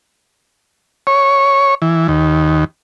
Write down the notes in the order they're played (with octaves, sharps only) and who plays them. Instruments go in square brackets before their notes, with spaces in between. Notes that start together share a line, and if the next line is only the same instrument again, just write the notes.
[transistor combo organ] C#5
E3
D#2